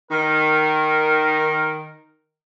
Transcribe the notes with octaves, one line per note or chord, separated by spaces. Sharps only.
D#3 A#4